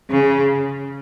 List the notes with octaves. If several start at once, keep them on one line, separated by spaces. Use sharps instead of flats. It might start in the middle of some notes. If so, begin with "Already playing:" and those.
C#3